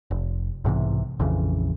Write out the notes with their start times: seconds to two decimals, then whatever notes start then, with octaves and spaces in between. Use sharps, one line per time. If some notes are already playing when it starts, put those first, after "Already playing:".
0.11 F1
0.64 B1 G#2 C3 E3
1.20 A#1 F2 C#3 E3